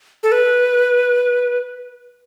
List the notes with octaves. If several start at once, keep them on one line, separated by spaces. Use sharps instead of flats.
A4
B4